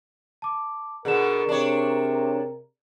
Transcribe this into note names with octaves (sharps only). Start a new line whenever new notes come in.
A5 D6
B2 D3 B3 G#4 A#4 E7
C3 D4 C#5